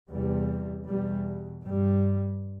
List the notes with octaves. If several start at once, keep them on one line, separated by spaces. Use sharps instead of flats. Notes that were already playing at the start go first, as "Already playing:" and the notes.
E2 C3 G3
E2 B2 G3
G2 G3